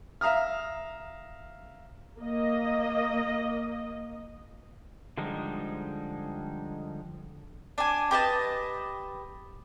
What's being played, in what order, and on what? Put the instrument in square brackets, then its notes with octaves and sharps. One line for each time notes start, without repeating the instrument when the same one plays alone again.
[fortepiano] E5 F5 A#5 D#6 F6
[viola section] A#3 D#5
[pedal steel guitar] D3 F3 G3 G#3 D#4
[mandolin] D4 G#5
G4 B4 D#5 A5